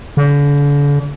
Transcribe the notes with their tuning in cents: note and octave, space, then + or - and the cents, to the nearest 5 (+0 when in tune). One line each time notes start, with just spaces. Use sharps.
D3 -40